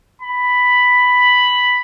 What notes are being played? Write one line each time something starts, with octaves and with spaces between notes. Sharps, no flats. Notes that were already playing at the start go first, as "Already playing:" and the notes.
B5